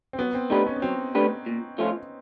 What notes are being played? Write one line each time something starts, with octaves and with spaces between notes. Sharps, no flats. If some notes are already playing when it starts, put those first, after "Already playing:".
C4
F#3 B3
C4
A3 D4 D#4 G4 B4
C#4
B3
F#3 C4
A3 D4 G4 B4
A#2
F3 A3 C#4 F4